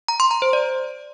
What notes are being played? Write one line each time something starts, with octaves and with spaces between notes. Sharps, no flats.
A#5
C6
A#5
C5
D5